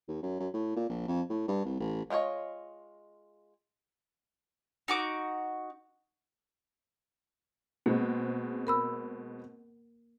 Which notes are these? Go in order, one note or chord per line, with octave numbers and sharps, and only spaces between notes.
D#2
F#2
F#2
A2
A#2
A#1
F2
A2
G2
C2
A1
G#3 F4 C5 C#5 D#5
D#4 F#4 D6
B2 G#3 A#3 C4
A#4 B5 E6